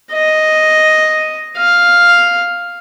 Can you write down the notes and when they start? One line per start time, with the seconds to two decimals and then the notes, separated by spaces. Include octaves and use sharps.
0.13 D#5
1.58 F5